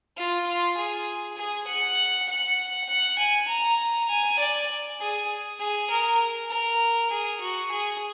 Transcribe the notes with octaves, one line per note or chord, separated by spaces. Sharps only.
F4
F4
G#4
G#4
F#5
F#5
F#5
G#5
A#5
G#5
D5
G#4
G#4
A#4
A#4
G#4
F#4
G#4